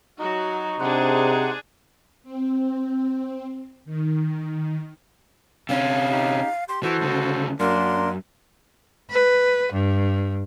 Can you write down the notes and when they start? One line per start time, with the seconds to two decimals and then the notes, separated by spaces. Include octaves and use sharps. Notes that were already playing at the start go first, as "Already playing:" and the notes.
0.20 F#3 D#4 F#4
0.80 C3 D4 G#4 C5 F#5
2.24 C4
3.85 D#3
5.69 C3 C#4 F5
6.12 D#4 G4
6.69 G4 C6
6.83 E3 F#4 A4 C5
7.01 D2 C#3
7.60 F#2 A#3 D4 A#4 C6
9.09 B4
9.73 G2